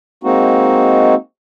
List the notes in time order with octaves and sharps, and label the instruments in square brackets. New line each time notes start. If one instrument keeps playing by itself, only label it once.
[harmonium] G#3 A#3 C4 D#4 F#4